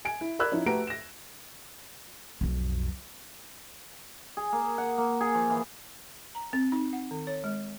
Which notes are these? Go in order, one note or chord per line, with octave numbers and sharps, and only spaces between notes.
G#5 D7
E4
A#4 D5 B5 E6 F#6 G#6
F3 C#4 D#4 E4
A3 F#4 G4 B4 A#5 D7
A#6 E7
B1 F2
G#4
A#3
F#5
A#3
G#4
F3
E3
A#5
C4
D#4
F#5
D#3
C#5
G#3